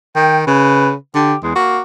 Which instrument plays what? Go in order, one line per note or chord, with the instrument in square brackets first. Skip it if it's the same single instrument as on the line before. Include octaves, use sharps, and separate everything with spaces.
[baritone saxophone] D#3 [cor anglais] G5
[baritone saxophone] C#3 [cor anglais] B4
[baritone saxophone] D3 [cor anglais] G4
[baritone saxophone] E2 [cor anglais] G#3
[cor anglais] A#3 [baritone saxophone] F#4